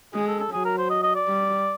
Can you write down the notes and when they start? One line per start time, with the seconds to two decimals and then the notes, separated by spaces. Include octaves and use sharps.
0.14 G#3 G#4
0.27 A4
0.39 A4
0.52 F#3 G#4
0.65 A#4
0.78 C5
0.90 D#5
1.03 D#5
1.15 D5
1.28 G3